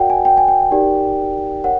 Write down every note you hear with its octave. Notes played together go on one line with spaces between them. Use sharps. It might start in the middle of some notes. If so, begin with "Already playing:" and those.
Already playing: F#4 A#4 D5 F#5 G5
G#5
G5
G#5
G5
D#4 G4 A#4 D5
A#4 C#5 F#5